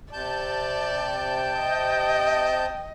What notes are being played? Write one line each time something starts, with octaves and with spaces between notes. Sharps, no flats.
C3 D5 A5 G6
G5
D#5